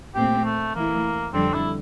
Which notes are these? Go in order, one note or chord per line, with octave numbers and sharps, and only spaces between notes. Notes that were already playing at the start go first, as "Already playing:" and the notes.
A#2 A3 C4 G4
A3
E3 A3 A#3 E4
F2 D3 G3 C4 D4 A4
E4